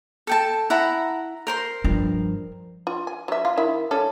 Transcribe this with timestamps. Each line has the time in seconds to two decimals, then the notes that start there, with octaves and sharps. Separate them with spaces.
0.27 A4 G5 A5
0.70 E4 F#5 A#5
1.47 A#4 C5 C6
1.84 G2 F3
2.87 F4
3.07 G#5
3.28 F#3 E5
3.45 F4
3.58 D#3 E4 E5
3.91 G3 C#4 A4